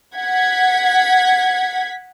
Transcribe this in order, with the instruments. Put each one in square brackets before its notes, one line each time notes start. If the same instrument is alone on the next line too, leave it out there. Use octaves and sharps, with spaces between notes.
[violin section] F#5 G#6 B6